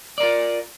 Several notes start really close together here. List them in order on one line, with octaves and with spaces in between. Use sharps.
D5 A#4 F4